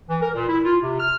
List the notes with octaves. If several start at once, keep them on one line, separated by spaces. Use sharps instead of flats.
E3
A#4
A#2
E4
F4
C3
F6